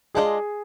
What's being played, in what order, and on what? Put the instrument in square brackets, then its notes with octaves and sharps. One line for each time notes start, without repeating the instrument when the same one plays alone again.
[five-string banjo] G#3 D4 F4 C5 D#5 [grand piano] G#4